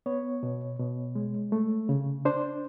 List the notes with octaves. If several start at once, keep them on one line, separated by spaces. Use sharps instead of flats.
B3 C#5
B2
B2
G#3
A3
C#3
D4 C5